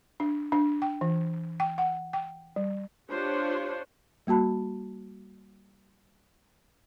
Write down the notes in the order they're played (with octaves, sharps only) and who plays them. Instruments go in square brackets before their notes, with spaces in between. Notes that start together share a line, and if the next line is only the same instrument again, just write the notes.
[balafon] D4
D4
G5
E3
G5
F#5
G5
G3
[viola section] D4 F4 G4 C5 C#5
[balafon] G3 A#3 F#4 A5 B5